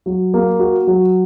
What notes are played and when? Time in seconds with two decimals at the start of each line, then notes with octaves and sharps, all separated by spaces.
0.06 F#3
0.34 A#3
0.59 F#4
0.87 F#3